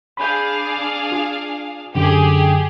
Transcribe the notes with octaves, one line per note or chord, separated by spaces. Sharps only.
D4 G#4 F5 B5 G6
F4
F#2 D3 G4 G#4